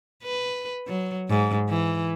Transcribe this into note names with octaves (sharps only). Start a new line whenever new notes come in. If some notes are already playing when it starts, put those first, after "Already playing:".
B4
F#3
G#2
E3